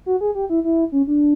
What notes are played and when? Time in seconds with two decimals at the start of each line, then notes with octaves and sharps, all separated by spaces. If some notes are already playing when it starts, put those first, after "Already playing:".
0.06 F#4
0.21 G#4
0.35 G4
0.50 E4
0.64 E4
0.92 C#4
1.07 D4